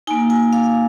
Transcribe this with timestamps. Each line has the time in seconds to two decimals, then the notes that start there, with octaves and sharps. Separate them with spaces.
0.07 A#3 D#4 G#5
0.30 G#5
0.53 F5